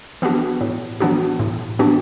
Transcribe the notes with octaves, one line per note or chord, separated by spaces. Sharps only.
E3 B3 D4 F#4
A2
E3 B3 D4 F#4
A2
E3 B3 D4 F#4